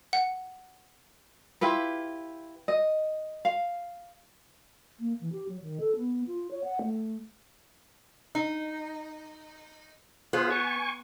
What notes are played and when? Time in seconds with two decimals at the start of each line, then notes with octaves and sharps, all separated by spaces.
0.13 F#5
1.61 E4 F4 G4 B4
2.68 D#5
3.45 F5
5.00 A#3
5.21 E3
5.33 G4
5.49 F#3
5.62 D#3
5.80 A4
5.96 B3
6.27 F4
6.51 C#5
6.64 F#5
6.82 A3
8.35 D#4
10.33 B3 F4 G#4 C5
10.50 G#5 C#6